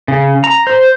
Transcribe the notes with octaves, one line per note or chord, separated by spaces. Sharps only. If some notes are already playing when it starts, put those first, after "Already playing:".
C#3
A#5
C5